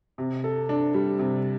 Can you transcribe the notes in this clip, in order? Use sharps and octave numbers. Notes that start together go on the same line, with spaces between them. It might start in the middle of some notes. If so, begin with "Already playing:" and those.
C3
A4
D4
G3
C3